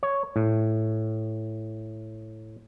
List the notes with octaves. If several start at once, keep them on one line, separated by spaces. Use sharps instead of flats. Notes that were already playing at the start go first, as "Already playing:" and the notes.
C#5
A2